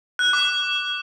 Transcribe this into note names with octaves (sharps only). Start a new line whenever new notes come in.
F#6
D6